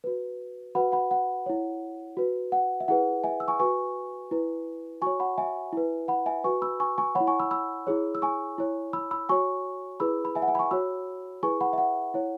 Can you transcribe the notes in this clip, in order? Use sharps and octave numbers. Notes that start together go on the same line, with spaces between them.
F#4 B4
F#4 B4 F#5 B5
F#5 B5
F#5
E4 C#5
F#4 B4
F#5
E5
E4 G#4 B4 F#5
E5 G#5
E6
G#5 C#6
F#4 B4 G#5 C#6
E4 B4
F#4 C#5 G#5 C#6
F#5 B5
E5 G#5
E4 B4
F#5 B5
E5 G#5
F#4 B4 G#5 C#6
B5 E6
G#5 C#6
G#5 C#6
C#5 F#5 B5
E4
G#5 C#6
B5 E6
B5 E6
E4 G#4 C#5
E6
G#5 C#6
E4 C#5
B5 E6
B5 E6
F#4 C#5 G#5 C#6
E4 G#4 B4 B5 E6
B5
E5 G#5
F#5
E5 G#5
B5
G#5 C#6
F#4 C#5 B5 E6
E4 G#4 B4 G#5 C#6
F#5 B5
E5
F#5
E4 C#5